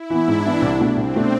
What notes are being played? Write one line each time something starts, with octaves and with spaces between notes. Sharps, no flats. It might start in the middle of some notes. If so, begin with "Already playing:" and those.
Already playing: E4
E3 B3
G#2 D4
E3 B3
C2 D4
B2 A3 D4
C2 C4
B2 A3 D4